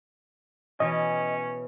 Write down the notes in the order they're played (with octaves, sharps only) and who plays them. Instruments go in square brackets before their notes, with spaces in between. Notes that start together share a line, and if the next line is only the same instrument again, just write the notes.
[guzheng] B2 E3 [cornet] C#4 [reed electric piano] D#5